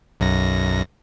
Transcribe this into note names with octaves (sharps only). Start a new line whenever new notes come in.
B1 F#2 A#6